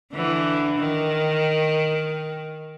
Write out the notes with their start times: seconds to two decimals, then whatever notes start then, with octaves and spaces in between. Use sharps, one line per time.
0.12 D3 E3
0.78 D#3